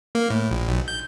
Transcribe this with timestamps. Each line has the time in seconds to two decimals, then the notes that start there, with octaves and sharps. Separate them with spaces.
0.15 A#3
0.30 A2
0.51 A#1
0.68 B1
0.88 G6